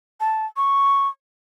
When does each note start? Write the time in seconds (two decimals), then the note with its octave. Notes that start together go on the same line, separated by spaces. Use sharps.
0.20 A5
0.57 C#6